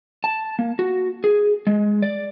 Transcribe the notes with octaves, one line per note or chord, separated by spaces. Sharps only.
A5
A#3
F#4
G#4
G#3
D5